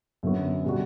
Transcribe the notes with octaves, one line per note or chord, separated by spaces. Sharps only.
F#2 D3 F#3 B3 F#4
B2 G3 D4 F#4